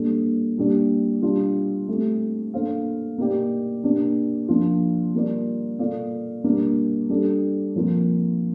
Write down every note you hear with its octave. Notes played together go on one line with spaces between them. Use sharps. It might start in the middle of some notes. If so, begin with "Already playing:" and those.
Already playing: A#2 G3 A#3 D4 A4
A#2 G3 D4
G3 D4 F4
A3 C4 G4
A#3 D4 A4 C5 F5
A#3 D#4 G4 D5
A#3 D4 G4
F3 A#3 D4 F4
G3 A#3 F4 A#4 D5
A#3 F4 A4 D5 F5
G3 A#3 D4
G3 D4 A4
A#2 F3 C4 F4 A#4